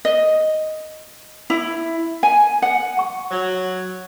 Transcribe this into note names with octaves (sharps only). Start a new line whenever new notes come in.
D#5
E4
G#5
F#5
F#5 C#6
F#3